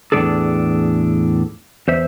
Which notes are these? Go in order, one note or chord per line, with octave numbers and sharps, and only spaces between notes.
E2 A2 G3 D4 G#4 A4
E2 C5 E5